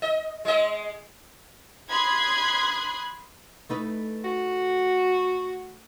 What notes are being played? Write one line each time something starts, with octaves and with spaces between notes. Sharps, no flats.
D#5
G#3 D#5
B5 C6 D#6 F#6 G#6 C7
A3 D#4 B4
F#4